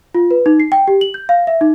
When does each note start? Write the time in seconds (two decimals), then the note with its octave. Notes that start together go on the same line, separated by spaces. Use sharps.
0.15 F4
0.31 B4
0.46 D#4
0.60 C7
0.72 G5
0.88 G4
1.01 F#7
1.14 G6
1.29 F5
1.47 E5
1.61 D#4